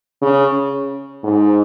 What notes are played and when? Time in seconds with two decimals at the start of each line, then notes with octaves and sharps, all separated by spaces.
0.22 C#3
1.24 G#2